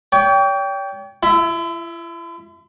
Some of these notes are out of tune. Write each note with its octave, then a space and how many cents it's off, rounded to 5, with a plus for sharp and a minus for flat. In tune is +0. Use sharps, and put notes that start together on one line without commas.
C#5 +45 G5 +0
E4 +45 E5 +0